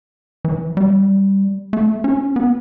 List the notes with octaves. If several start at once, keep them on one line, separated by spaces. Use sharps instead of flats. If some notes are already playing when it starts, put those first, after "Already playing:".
E3
G3
A3
C#4
B3